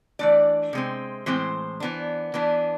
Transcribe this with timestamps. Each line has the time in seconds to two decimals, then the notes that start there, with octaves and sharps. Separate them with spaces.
0.19 E3 A3 D4 D5
0.73 C3 G#3 C4
1.26 A2 E3 G#3 C4 C5
1.80 E3 B3 D4
2.34 E3 B3 D4